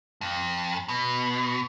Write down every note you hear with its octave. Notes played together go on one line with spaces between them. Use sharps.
F2
B2